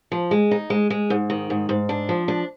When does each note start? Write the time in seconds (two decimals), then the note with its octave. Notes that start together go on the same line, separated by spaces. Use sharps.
0.12 F3
0.31 G#3
0.51 D#4
0.70 G#3
0.90 G#3
1.10 G#2
1.30 D#3
1.50 G#2
1.69 G#2
1.89 D4
2.09 F3
2.28 D4